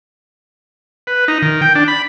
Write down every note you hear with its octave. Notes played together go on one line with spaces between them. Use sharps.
B4
D#4
D#3
G5
D4
B5